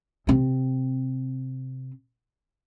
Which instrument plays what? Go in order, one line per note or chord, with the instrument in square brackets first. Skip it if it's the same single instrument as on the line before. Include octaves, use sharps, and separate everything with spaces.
[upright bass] C3 C4